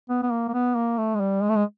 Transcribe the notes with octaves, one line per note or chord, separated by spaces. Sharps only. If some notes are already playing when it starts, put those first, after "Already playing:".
B3
B3
A#3
A#3
B3
A#3
A3
G#3
G3
G#3
A3
G#3